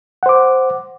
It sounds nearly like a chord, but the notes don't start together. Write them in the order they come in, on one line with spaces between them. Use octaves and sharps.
F#5 C5 D6